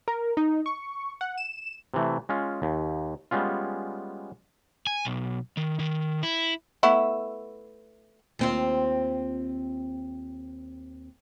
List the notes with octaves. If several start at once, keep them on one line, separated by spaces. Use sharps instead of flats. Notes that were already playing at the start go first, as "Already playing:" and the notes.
A#4
D#4
C#6
F#5
E7
C3 E3 A3
G#3 C#4 F4
D#2
G3 G#3 B3 C#4 F4
G#5
B1
D#3
D#3
E4
A3 B3 E4
D#2 C4 F4